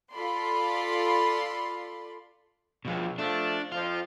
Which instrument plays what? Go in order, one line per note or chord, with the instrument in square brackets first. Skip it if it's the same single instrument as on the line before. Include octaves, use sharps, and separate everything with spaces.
[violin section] F4 A4 D5 B5 C6
[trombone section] C#2 [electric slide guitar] B2 F3
[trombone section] F3 A3 [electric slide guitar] D4
[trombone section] F2 F3 [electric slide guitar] F4